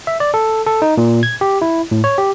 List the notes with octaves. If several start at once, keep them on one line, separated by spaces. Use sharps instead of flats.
E5
D5
A4
A4
D#4
A#2
G#6
G4
E4
A2
C#5
G4